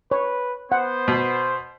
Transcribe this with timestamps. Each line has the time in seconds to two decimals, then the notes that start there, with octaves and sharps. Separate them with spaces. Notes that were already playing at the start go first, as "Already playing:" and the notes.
0.11 B4 C#5
0.72 B3 C5 F#5
1.08 B2 B5